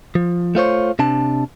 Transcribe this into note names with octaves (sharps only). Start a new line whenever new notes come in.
F3
A3 F4 C5 C#5
C3 D4 A5